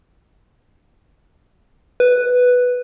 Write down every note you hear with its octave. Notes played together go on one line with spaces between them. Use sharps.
B4